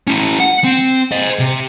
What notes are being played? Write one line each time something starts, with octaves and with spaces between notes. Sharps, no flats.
C#4 E4
F#5
C4
C5 D#5
C3